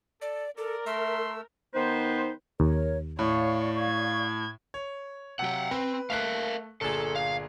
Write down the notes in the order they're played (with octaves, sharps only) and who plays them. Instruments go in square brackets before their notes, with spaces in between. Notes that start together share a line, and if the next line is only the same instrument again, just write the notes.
[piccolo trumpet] A4 [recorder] D5
[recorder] A4 [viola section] A#4 [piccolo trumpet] D5
[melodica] A3 E6 [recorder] E5 [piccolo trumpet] C6
[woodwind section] D#3 B3 D#4 B4 C5
[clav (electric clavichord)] D#2 [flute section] A#4 C#5
[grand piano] A2 [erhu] C#5 [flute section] D5 F5 C#6
[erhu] G#6
[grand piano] C#5
[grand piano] C3 F#3 [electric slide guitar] F#5 G5
[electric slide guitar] C4 [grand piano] B4
[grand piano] A3 F#6 [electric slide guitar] A#4 E5 F5
[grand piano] G1 A#2 G#4 [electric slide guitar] A4
[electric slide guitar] F5